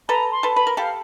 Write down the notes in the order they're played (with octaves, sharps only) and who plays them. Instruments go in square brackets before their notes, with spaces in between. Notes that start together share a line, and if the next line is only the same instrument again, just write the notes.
[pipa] A4 B4 [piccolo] A#5
[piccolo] C6
[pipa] A4 B4
[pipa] B4 [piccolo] B5
[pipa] A#4
[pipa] G4 A4 [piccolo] F5